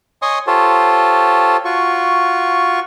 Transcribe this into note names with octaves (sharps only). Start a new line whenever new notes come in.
C#5 D#5 G#5 C6 C#6 D#6
F4 G4 A4 C5 C#5
F4 F#4 C#6